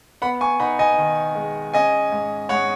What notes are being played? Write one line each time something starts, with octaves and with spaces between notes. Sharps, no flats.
B3 F#5 B5
G#5 C#6
D#4 F#5 B5
D#5 G#5
D#3
G#3
C#4 D#5 G#5
G#2
G#2 C#5 F#5